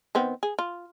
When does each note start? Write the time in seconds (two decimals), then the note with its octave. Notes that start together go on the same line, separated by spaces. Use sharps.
0.15 D#3 B3 C4
0.43 G#4
0.59 F4